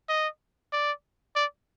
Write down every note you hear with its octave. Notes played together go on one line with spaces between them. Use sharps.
D#5
D5
D5